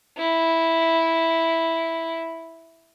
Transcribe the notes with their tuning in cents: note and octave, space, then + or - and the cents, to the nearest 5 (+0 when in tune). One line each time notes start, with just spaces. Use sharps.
E4 -5